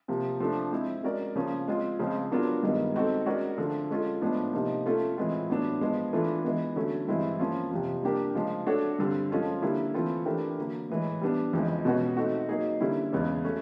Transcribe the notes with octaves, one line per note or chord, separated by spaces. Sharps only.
C3 F3 A#3
F3 A3 D4
G#3 C4 E4
G#3 C#4 F#4 A#4 D5
C#3 F3 A#3 C#4
G#3 C4 F4
C#3 F3 G#3 C4
F#3 B3 D4 F4 A#4
G2 D#3 G#3 B3
G#3 C4 D#4 F#4 A4
G#3 C#4 F#4 A#4 D5
D3 F3 A3
G#3 C#4 F4 A4
A2 F3 G#3 B3 D4
C3 F3 A#3 D#4
A3 C#4 F4 A4
A2 E3 G#3 C4 F4
A2 F#3 B3 D4
F3 G#3 B3
E3 A3 D4 F4 A4
E3 G#3 B3
D3 F#3 A3 C#4
G2 E3 G#3 C4 E4
F3 A#3 C#4 F4
F2 C3 F3
G3 A#3 D4 G4 A#4
C#3 F3 G#3
A3 D4 F#4 A4 C#5
G2 D3 G3 C4
F3 G#3 C#4 F4 A4
D3 G3 A#3 C#4 E4
E3 A3 C4 F4 A4
E3 A3 D4 G4 A#4
D3 F#3 A#3
A2 E3 G#3
G3 B3 D4
F2 C#3 E3 G#3
B2 G#3 C#4 F#4 B4
A3 C4 D#4 F#4
F#3 A#3 D#4 G#4
D3 G3 A#3 C#4 E4
E2 C#3 E3 G#3 C#4
F#3 A3 C#4